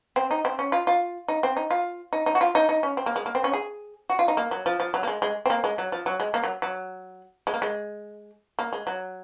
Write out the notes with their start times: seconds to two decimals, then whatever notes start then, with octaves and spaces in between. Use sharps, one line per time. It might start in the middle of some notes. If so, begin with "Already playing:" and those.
0.16 C4
0.31 D#4
0.45 C4
0.59 C#4
0.72 F4
0.87 F4
1.28 D#4
1.43 C4
1.57 D#4
1.71 F4
2.13 D#4
2.26 D#4
2.35 F#4
2.41 F4
2.55 D#4
2.69 D#4
2.83 C#4
2.97 C4
3.06 A#3
3.16 G#3
3.26 A#3
3.35 C4
3.44 C#4
3.53 G#4
4.10 F#4
4.19 F4
4.28 D#4
4.37 A#3
4.51 F#3
4.66 F3
4.80 F3
4.94 F#3
5.03 A#3
5.07 G#3
5.22 G#3
5.46 C4
5.50 A#3
5.64 G#3
5.78 F#3
5.92 F3
6.06 F#3
6.20 G#3
6.34 A#3
6.44 F#3
6.62 F#3
7.47 G#3
7.54 A#3
7.62 G#3
8.59 A#3
8.73 G#3
8.87 F#3